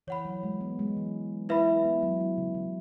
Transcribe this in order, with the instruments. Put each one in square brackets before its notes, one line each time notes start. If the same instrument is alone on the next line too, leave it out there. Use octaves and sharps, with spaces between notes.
[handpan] E3 [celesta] C#5 F#5 B5
[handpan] F#3
G#3
B3
G#3
E3
[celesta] E4 B4 E5 B5
[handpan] B3
F#3
E4
C#3
C#3